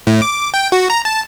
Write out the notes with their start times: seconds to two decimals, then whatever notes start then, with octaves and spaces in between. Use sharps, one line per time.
0.07 A2
0.22 D6
0.54 G5
0.72 F#4
0.90 A#5
1.05 A5